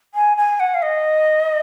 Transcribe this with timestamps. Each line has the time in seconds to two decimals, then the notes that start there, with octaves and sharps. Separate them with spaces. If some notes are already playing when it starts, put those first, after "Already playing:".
0.14 G#5
0.37 G#5
0.59 F#5
0.74 F5
0.82 D#5